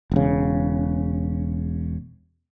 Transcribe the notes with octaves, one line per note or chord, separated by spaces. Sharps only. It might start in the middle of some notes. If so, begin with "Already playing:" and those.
E1 C#3